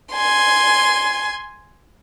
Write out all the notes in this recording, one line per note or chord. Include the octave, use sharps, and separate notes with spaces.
G#5 C6